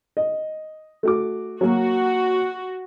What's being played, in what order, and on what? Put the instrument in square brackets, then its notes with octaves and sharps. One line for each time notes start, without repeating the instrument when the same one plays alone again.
[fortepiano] D#5
A3 F#4 D6
[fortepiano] F#3 A#3 [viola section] F#4